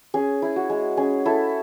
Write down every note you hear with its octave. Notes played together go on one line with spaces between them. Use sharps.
C#4 G#4
E4
F#4
G#3
C#4 G#4
E4 A4